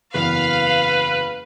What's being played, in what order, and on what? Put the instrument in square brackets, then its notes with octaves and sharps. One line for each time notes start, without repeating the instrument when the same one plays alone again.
[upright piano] F#1 E2 [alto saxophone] B4 [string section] F5